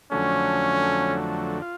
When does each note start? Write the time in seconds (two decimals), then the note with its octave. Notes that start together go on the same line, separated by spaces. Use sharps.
0.11 F2 D3 F#3 A3 C#4
1.62 F4